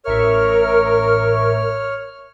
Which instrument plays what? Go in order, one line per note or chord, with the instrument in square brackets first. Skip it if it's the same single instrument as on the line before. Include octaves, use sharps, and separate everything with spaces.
[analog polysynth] A1 E5 C#6 [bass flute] A#4 [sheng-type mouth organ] C#5 F6